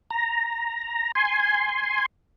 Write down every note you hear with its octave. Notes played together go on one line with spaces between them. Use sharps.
A#5
G#5 C6